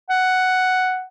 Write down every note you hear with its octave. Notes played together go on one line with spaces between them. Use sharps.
F#5